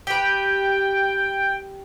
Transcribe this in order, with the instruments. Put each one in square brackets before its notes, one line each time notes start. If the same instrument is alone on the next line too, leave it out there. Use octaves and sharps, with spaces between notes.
[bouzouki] G4 B4 [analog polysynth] G5